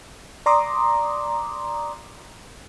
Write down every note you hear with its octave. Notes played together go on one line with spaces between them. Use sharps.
D5 A#5 C6 D6 D#6